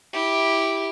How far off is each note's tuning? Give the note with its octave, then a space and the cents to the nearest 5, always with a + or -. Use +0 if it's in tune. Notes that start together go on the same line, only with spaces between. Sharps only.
E4 -10 G4 +0